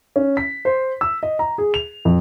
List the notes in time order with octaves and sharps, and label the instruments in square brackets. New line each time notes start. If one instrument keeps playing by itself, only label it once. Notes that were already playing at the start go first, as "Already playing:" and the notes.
[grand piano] C#4
B6
C5
E6
D#5
A#5
G#4
F7
F2